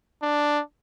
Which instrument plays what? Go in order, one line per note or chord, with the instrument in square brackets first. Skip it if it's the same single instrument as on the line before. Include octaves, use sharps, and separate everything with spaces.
[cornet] D4